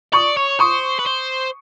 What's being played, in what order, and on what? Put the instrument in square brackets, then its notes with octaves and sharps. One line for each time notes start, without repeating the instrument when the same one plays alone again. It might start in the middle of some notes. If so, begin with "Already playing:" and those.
[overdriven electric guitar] D5 [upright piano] C#6 D#6
[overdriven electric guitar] C#5
[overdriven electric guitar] C5 [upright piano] C#6 D#6
[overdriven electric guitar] B4
C5